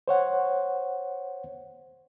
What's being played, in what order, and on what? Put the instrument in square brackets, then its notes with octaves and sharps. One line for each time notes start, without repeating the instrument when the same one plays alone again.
[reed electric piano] C5 C#5 F#5